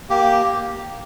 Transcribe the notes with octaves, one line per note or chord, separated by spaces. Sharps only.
A#3 G4